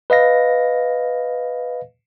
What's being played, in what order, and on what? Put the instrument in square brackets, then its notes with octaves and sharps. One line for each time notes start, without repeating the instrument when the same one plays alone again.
[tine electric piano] B4 D#5 F5 A#6